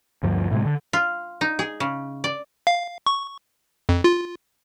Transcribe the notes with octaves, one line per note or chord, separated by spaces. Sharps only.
D2 G2 F3
A2 C3 G#3
D3
F4
D#4
G#4
C#3
D5
F5
C#6
F2
F4